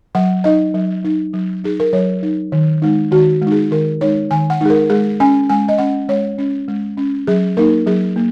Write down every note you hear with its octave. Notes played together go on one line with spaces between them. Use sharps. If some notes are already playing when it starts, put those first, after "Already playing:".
F#3 F#5
D#4 D#5
F#3
D#4
F#3
D#4 G#4
A#4
F#3 C#5
D#4
D#3
G#3 D#4
D#3 F#4
G#3 D#4
G#4
D#3 A#4
G#3 D#4 C#5
D#3 G#5
F#5
G#3 D#4 G#4
A#4
G#3 G#4
C#4 G#5
G#3 G#5
D#5
C#4 F#5
G#3 C#5
C#4
G#3
C#4
F#3 G#4
A#3 D#4 A#4
F#3 G#4
A#3